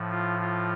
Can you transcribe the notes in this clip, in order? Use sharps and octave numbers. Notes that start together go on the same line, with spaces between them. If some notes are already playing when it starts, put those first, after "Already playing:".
Already playing: A2 F3
F4
F4